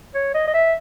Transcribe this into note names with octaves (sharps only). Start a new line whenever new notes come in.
C#5
D#5
D#5
E5